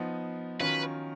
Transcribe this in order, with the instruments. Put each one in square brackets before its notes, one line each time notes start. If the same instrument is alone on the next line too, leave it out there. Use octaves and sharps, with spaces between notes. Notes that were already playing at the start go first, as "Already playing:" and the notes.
Already playing: [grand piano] F3 B3 D#4
[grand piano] D#3 F#3 C#4 F4 [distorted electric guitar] B4